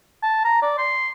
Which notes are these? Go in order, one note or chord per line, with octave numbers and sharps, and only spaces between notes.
A5
A#5
D5
C6